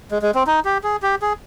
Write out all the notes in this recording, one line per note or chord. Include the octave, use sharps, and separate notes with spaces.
G#3
G#3
C4
D#4
G4
G#4
G4
G#4